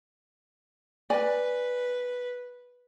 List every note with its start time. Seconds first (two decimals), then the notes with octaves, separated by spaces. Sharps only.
1.10 B4 D5 G#5